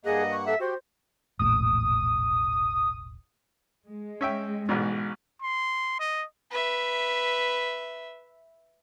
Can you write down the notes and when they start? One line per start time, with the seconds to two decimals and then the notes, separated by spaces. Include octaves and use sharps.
0.05 G2 A#3 G#4 D#5 F#5
0.32 C#6
0.47 A4 E5
0.60 F#4 G4 C5
1.39 E1 A#1 A2 D#6
3.88 G#3
4.21 C#4 E5 G5
4.69 A1 G#2 B2
5.42 C6
6.00 D#5
6.51 B4 E5